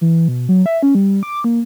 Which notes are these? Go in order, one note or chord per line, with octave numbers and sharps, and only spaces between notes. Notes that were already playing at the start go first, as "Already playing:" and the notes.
E3
B2
F#3
E5
C#4
G3
D6
A#3